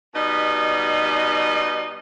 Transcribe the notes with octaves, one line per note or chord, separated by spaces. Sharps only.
B2 G3 D#4 D#5